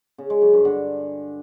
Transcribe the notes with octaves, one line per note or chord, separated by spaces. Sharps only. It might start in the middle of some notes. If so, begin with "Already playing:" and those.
C#3
G#3
F#2
G2
D3